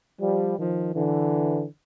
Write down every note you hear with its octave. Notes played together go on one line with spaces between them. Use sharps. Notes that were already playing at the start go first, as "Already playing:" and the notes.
F3 G3
D#3 F3
D3 E3